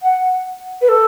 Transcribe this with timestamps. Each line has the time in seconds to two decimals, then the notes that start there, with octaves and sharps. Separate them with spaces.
0.02 F#5
0.81 B4
0.88 A4